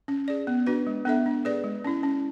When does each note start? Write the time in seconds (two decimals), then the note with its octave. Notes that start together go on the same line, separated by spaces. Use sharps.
0.08 C#4
0.28 G#4 D5
0.47 B3
0.67 D4 F#4 B4
0.87 G#3
1.05 B3 D4 A4 E5
1.26 D4
1.45 G#4 B4 D5
1.64 G#3
1.84 C#4 E4
2.03 C#4